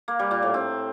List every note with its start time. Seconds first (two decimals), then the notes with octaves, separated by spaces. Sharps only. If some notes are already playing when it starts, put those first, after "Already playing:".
0.08 A#3
0.19 G3
0.31 A#2
0.42 A2
0.54 C4